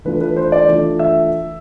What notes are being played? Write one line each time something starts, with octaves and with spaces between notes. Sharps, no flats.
E3 A3 D4 F4 B4
B4
C5
D5
E3 A3 D4 F4
E5